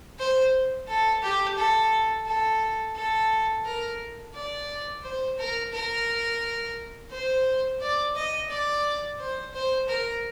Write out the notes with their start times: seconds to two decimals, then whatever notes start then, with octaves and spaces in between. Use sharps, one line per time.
0.19 C5
0.88 A4
1.23 G4
1.58 A4
2.26 A4
2.96 A4
3.65 A#4
4.34 D5
5.04 C5
5.39 A#4
5.73 A#4
7.11 C5
7.81 D5
8.16 D#5
8.50 D5
9.19 C5
9.54 C5
9.89 A#4